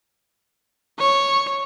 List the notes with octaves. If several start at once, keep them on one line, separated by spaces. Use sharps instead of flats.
C#5